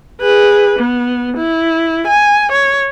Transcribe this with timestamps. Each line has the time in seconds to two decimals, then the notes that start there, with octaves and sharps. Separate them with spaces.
0.21 G#4 B4
0.79 B3
1.37 E4
2.08 G#5
2.52 C#5